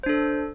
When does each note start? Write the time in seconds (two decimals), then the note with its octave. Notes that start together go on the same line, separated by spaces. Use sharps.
0.03 C5
0.06 D4
0.09 A4